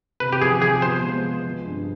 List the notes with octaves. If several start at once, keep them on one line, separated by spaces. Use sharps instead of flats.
C3 B4
G4
F3 G#4
F3 G#4
B3 C5
G#3
F3
F3
G2